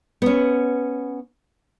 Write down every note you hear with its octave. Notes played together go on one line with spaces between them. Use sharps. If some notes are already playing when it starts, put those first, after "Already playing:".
B3 C#4